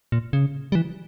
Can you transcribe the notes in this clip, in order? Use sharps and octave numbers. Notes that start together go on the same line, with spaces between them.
A#2
C#3
G3
E3